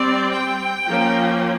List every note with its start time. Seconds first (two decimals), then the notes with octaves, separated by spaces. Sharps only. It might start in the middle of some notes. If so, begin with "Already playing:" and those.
Already playing: G3 C4 D5
0.31 G5
0.87 F3 A#3 C#4